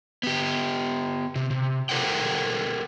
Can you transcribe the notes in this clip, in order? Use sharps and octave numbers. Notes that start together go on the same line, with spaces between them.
B3 G4
C3
C3
G4 A4 A#4 C5 F#5 G5